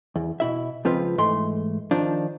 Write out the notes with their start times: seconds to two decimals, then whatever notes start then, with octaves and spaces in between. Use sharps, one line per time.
0.16 E2
0.40 B2 E4 E5
0.85 C#2 F3 C4 F4 B4
1.18 G#2 E3 A3 C6
1.91 D#3 F3 D4